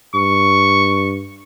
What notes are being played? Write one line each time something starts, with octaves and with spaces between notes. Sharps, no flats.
G2 C#6